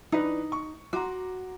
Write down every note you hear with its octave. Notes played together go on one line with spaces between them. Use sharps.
E3 D4 D#4 B4
C#6
F#4 A#5 C6 D6